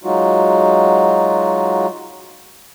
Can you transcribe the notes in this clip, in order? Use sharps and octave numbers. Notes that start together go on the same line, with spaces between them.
F#3 G#3 D#4 F4 F#4